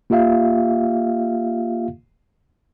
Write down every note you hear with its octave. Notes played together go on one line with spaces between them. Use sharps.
A#3 F4 G4 E5 F5